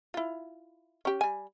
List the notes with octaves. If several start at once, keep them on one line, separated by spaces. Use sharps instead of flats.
E4 F4
C#4 G4
G3 G#5